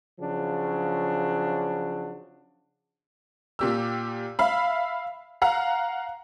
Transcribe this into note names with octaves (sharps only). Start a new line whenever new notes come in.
C#3 F3 F#3 D4
A#2 G4 E6
E5 F5 B5
F5 F#5 A#5